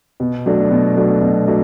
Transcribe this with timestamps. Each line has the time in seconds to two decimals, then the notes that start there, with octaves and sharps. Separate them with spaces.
0.20 B2
0.46 F#3 A3 D4
0.71 B2
0.97 F#3 A3 D4
1.22 B2
1.47 F#3 A3 D4